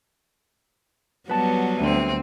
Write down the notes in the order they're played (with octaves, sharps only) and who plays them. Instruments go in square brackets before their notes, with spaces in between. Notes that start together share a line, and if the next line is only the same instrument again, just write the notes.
[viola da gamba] F#3 G3 B3 [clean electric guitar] B4 A5
[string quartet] D2 C4